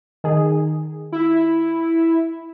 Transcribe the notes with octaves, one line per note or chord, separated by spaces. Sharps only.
D#3 G#4
E4